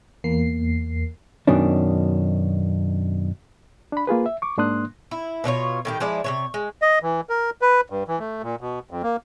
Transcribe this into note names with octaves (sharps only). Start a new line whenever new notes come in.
E2 A#3 C7
F#2 B2 D#3 C#4 D4
D4 B5
A#3 F4 G#4 B4
E5
C#6 D6
G#2 A#3 D4 C6 D#6 F#6
E4
B2 D4 F4 C#5
A2 D#3 G4
F3 G#3 E4 D5
C3 F#3 C#5
G#3
D#5
E3
A#4
B4
G2
E3
A3
A#2
B2
F2
A#3